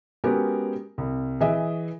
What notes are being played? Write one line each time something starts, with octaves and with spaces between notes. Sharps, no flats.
G#3 B3 C#4 F#4 G4 A#4
C2
E3 G#4 D#5 E5